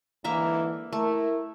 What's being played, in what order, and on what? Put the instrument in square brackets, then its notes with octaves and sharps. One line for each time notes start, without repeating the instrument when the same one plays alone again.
[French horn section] G#2 D3 E3 [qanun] A#3 E5 A#5
[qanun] A3 [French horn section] E4 A#4